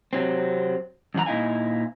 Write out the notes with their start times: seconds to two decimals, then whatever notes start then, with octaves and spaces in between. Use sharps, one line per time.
0.13 C3 F#3 C4
1.14 F#2 E3 F#5 A#5
1.26 A#2 D#4 E4 F5 G#5